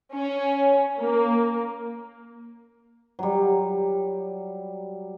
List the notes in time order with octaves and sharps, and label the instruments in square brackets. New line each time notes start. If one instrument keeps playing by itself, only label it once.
[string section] C#4
A#3
[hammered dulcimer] F#3 G3